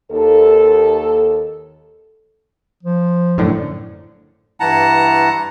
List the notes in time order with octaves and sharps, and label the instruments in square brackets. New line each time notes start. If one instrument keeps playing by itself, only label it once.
[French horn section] D#2 A4
[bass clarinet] F3
[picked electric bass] F#2 A2 D3
[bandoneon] G2 E3 E4 F#5 A5 A#5